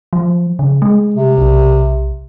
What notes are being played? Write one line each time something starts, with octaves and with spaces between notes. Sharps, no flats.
F3
C#3
G#3
C3
B1